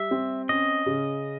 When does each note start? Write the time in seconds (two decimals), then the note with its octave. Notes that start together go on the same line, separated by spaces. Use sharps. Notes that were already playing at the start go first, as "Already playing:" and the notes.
Already playing: G3 E5
0.11 C4
0.49 C#4 D#5
0.86 C#3